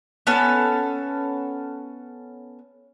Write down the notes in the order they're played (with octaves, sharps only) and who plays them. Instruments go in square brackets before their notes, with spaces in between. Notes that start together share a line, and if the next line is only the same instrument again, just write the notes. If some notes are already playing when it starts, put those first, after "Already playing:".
[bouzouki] B3 C#4 A4